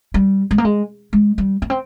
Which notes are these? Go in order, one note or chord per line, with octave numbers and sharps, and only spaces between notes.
G3
G#3
A#3
G#3
G#3
G3
A#3
C4